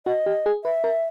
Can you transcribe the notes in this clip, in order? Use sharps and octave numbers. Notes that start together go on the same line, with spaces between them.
F#4 D#5
G4
G#4
B4 E5
A#4